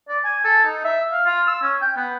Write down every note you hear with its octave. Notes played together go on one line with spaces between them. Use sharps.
D5
G#5
A4
D#4
E5
F5
F4
E6
C#4
G5
B3